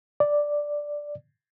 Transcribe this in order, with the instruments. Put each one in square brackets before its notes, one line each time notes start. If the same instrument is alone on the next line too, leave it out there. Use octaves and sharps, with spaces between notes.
[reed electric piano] D5